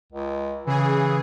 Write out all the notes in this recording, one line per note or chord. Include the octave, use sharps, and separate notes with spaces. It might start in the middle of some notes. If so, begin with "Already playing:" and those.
C#2
C#3 E3 G#4